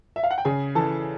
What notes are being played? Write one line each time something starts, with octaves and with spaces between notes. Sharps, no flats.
E5
F5
F#5
G5
C#3 G#4 G#5
E3 A4 A5